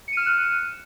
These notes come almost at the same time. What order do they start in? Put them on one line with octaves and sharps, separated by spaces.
C#7 D#7 F6 E7 F#6